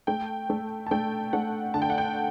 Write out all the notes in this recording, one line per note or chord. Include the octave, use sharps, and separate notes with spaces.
A3 G5
A3
A5
A3 G5
A3 F#5
D3 A5
G5
F#5
G5